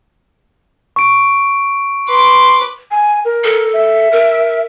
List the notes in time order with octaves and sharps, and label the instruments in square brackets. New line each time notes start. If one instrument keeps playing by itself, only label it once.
[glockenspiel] C#6 D7
[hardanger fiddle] B4 D6 [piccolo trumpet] C6
[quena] G#5
A#4
[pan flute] A4
[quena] E5
[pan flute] A#4